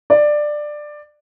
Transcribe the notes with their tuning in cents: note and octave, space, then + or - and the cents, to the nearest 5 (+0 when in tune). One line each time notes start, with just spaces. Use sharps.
D5 +15